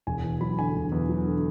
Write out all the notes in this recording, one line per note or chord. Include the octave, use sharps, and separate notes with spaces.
E1 G#5
E2
F#3 B5
D3 G#5
E1
E2
F#3
D3